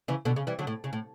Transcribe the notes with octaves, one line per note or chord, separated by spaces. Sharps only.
C#3 E3
B2 D3
C#3
E3 G3
D3 F#3
A2
C#3
A2